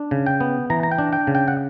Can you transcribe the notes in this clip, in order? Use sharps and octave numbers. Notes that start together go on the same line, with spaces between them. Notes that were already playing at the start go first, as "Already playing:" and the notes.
Already playing: D4
C#3
G5
B3
E3 A#5
A#5
G5
D4
G5
C#3
G5
F#5